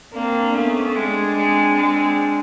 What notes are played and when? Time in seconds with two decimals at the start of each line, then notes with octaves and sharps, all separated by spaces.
0.13 A#3 C4 D4
0.53 A3 B3 C#4
0.94 G#3 C4 D4
1.36 G#3
1.76 G#3